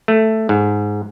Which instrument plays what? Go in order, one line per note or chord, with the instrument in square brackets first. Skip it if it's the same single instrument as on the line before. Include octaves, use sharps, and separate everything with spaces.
[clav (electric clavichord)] A3
G#2